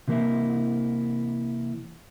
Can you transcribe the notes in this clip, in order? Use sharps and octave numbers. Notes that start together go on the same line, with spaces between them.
C3 E3 A#3 C4 E4